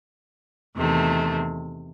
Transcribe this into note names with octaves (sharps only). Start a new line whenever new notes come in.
E2 C3 D#3 A3